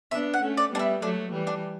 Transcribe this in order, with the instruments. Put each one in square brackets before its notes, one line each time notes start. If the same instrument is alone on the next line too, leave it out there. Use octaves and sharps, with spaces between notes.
[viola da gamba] B3 D4 [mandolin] E5
[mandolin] F#5
[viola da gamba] A3 C#4
[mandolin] D5
[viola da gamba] G3 B3 [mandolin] D4
[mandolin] E4
[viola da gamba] F#3 A3 [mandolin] D4
[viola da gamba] E3 G3
[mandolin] D4